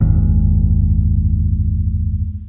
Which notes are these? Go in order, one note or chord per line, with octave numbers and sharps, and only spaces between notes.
F#1 D#2 G#2